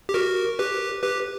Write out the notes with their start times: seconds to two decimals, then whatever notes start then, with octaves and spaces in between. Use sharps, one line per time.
0.09 G4
0.14 F#4 A#4
0.59 G4 B4
1.02 G4 B4